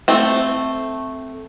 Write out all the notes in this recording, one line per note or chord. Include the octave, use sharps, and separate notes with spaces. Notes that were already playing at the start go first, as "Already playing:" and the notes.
A3 C4